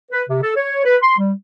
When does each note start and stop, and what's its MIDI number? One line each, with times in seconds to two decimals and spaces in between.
0.11 0.23 71
0.29 0.38 48
0.42 0.52 69
0.56 0.81 73
0.85 0.96 71
1.02 1.15 84
1.18 1.32 55